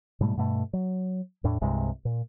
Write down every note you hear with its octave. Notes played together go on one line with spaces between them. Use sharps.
G#2 B2 G3 A3
G2 B2 A3
F#3
E2 A2 D4
C2 G2 C3 G#3
A#2